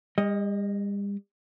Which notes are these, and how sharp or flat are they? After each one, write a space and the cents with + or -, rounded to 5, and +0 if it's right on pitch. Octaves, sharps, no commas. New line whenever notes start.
G3 +45 D#5 +0